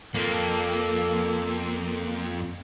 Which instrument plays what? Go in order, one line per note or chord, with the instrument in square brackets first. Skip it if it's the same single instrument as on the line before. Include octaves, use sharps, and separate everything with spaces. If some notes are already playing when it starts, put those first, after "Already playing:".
[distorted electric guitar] F2 [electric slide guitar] A#3 [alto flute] A4